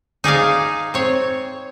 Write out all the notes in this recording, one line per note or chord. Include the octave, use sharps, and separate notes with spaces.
D#4 G#4 D5 F5
C4 C#5